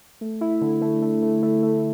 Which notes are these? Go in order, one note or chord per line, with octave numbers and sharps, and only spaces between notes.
A3
E4
D3
A3
A3
A3
A3
A3